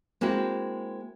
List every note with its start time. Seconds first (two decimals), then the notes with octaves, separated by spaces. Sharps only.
0.21 G#3 A#3 C4 E4 F#4